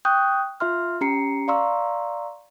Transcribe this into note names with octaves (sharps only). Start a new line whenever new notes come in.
G5 C#6 D#6 F#6 G6
F4 E5 C6 F6
C#4 G4 A#5 C7 C#7
D5 F5 A#5 C6 C#6 E6